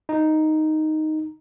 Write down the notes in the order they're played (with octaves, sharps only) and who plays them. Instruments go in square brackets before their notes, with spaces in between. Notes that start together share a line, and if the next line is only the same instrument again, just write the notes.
[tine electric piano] D#4